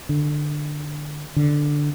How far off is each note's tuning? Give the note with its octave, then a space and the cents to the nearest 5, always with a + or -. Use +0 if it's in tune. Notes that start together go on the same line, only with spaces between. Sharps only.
D3 +15
D3 +0